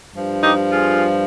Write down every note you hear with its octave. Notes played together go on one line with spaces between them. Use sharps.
G2 F3
D#4 G4
F4 G#4